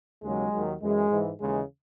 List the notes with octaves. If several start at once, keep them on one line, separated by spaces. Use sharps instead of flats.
D#2 C#3 F#3 G#3
D#2 D#3 F#3
F#2 E3 G#3
G#2 E3
D#2 C#3 E3 G#3